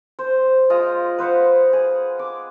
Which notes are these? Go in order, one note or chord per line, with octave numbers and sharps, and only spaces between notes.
C5
G#3 F4 D#5
B4 C5 F5 F#5
G#4
D6